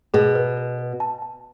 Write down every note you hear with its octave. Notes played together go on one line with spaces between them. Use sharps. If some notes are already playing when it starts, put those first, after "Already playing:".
B2 G#4
B4
B4
B4
A5
A5